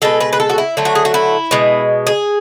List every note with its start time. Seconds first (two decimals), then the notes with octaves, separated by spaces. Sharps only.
0.02 B2 G#3 A4
0.20 B4
0.33 B4
0.40 A4
0.50 F#4
0.58 E4
0.77 D3 F#3 A3
0.85 F#4
0.95 G#4
1.05 F#4
1.14 E4
1.51 B2 G#3
2.07 G#4